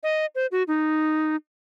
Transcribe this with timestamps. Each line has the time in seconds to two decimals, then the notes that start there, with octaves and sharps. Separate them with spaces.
0.03 D#5
0.35 C5
0.52 F#4
0.68 D#4